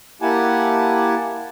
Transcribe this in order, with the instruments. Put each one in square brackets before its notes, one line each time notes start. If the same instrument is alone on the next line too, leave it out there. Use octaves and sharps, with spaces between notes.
[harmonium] A#3 E4 G4 F#5 G#5 A5